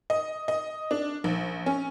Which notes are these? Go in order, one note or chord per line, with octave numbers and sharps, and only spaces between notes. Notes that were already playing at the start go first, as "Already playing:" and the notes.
D#5
D#5
D4
A#1
C#4